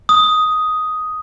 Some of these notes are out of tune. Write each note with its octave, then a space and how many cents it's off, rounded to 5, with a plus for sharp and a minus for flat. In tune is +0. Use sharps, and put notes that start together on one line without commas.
D#6 +5